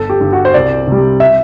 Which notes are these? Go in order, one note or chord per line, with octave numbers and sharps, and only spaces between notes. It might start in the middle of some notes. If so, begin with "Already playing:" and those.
Already playing: G1 A4
G4
G2 D3
F#4
C5
C2 D5
C3 G3
E5